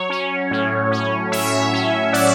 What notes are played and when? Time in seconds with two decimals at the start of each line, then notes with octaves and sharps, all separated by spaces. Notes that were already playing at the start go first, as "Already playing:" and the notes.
Already playing: F#3 C#5
0.10 C#4
0.51 A2
0.91 C#4
1.32 A2 C#5 E5
1.73 C#4
2.13 A2 D5 F#5